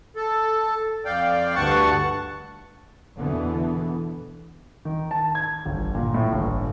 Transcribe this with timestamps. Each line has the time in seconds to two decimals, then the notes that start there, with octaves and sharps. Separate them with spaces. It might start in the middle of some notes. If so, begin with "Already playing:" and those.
0.16 A4
1.05 F2 D5 F5 G5
1.55 D2 G2 F#5 A5 C#6
3.20 E2 B2 D3 E3 B3
4.85 D#3
5.11 A5
5.35 G#6
5.66 G1
5.95 A#2
6.14 A2
6.32 G1